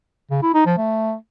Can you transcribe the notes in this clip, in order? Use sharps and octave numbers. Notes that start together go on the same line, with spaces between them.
C#3
E4
D#4
F3
A3